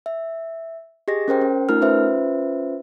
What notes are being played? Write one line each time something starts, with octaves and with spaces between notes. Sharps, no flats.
E5
G4 G#4 D#5 A#6
C#4 A#4 C5 G5
C#4
A3 D#4 F4 A#4 F6
C#4 F4 B4 C5 E5